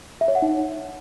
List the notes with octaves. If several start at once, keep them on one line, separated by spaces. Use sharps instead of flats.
E5
C#5
F#5
D#4